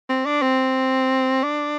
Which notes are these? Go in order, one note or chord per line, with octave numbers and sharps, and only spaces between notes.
C4
D4
C4
D4